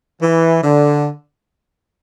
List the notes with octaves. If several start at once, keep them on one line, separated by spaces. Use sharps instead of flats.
E3
D3